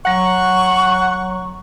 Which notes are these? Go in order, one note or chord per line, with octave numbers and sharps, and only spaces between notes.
F#3 C#5 F#5 A#5 C#6